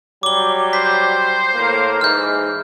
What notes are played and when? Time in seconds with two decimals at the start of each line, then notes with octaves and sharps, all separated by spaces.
0.23 F#3 G3 D6 G7
0.73 C5 B6
1.55 A2 A#3
2.01 G#2 E3 F6 G6